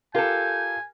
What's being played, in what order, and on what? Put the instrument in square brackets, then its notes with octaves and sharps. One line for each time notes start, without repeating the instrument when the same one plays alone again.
[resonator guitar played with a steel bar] F4 A4 [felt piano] G4 A#4 [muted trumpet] G#5 [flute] G6